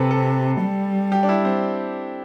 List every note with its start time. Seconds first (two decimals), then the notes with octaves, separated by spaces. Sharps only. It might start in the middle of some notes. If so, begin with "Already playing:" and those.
Already playing: C3 C4 A4 B4
0.11 A4
0.61 G3
1.12 G4
1.23 D4
1.29 E4
1.45 C4